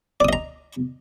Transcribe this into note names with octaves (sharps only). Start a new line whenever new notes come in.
D5 D#5 A#5 D#6